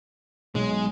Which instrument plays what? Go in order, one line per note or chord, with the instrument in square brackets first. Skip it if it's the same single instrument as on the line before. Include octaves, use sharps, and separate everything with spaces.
[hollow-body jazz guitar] B1 [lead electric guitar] G#3